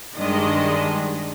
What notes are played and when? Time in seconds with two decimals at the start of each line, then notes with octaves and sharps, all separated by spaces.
0.16 G2 D#3 G#3 D4 D#5